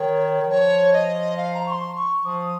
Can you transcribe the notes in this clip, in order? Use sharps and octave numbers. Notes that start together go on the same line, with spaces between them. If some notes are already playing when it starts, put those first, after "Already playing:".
Already playing: D#3 C#5
D#3
F3 C#5
D#5
F5
A#5
C#6
C6
C#6
F3 D#6